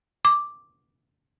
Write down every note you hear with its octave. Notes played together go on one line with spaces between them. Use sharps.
D6